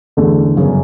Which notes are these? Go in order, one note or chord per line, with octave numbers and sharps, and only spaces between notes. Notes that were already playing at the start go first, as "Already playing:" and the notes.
E2 D3 A3
G1 F#2 C#3